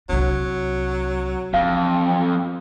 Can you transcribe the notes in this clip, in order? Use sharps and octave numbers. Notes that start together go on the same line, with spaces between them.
C2 F#3 D4
F2 E3 F5